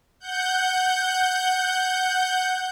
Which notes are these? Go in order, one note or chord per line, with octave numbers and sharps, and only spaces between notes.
F#5 G6